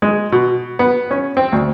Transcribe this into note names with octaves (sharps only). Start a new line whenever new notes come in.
G#3
B2
B3
C#4
C4
D2